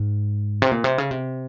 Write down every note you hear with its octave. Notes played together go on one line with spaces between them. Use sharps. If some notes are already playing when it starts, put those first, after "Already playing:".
Already playing: G#2
C3
A#2
C3
C#3
C3